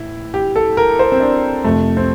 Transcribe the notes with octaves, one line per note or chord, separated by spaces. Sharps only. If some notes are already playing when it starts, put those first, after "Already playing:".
Already playing: A2 E3 E4
G4
A4
A#4
C5
C4
D4
F2 C3 F3 A3
C4